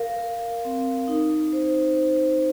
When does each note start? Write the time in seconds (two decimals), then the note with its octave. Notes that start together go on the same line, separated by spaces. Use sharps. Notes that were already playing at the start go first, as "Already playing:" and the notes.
Already playing: A#4 F5
0.20 A#4
0.65 C4
1.08 D#4
1.53 C5
1.95 C5